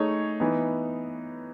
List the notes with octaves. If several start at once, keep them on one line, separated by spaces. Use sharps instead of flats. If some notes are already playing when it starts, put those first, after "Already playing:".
Already playing: A3 D#4 G#4 C#5
E3 B3 D#4